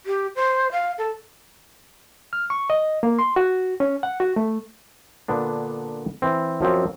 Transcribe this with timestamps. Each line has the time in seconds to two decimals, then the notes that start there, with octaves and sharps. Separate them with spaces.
0.06 G4
0.36 C5
0.72 F5
0.98 A4
2.33 F6
2.50 C#6
2.70 D#5
3.03 A#3
3.19 C6
3.36 F#4
3.80 C#4
4.03 F#5
4.20 F#4
4.36 A3
5.28 A#2 D3 B3 D4
6.22 E3 C4
6.61 F#2 F3 F#3 C4